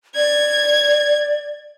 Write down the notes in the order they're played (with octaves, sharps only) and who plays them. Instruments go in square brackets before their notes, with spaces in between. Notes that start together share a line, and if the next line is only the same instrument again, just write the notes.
[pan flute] D5 [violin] G#6